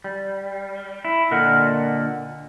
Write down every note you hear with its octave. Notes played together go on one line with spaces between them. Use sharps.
G3
E4
A#2 D3 A#4 D#5 F#5